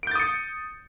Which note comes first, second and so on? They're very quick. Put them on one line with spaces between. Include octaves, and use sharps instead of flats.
D7 G6 A6 D#6 C#7